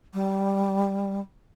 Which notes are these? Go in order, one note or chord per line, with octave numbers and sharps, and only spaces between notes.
G3